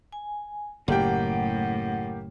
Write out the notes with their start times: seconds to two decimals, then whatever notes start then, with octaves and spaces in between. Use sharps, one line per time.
0.13 G#5
0.88 F#1 A2 A#3 G4 F#5 G5